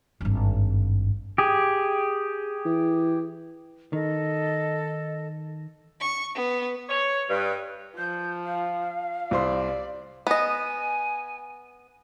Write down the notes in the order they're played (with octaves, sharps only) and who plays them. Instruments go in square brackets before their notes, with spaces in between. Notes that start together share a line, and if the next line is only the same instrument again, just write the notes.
[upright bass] G#1 G2
[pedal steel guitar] G4 G#4
[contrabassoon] E3
[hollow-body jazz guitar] D#3 [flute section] A4 D#5
[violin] C#6
B3
[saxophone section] C#5
G2
[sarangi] F3 [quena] G6
[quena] F5
[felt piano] C2 C5 C6 [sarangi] D5
[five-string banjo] B3 D#5 [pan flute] G#5